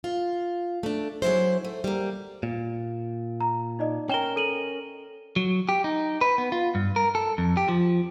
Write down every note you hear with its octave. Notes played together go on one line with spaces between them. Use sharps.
F4
A3 D4
F#3 G#3 A#3 E4 C5
A3
G3 A#3
A#2
A#5
D#4 D5 D#5
C#4 A#4 G5 E7 G7
A4 D#7 F#7
F#3
G4
D#4
B4
B3
F4
G2
A#4
A4
F2
G4
F3